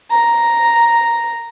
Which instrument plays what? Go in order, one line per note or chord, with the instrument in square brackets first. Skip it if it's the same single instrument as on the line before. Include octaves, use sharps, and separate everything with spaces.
[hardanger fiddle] A#5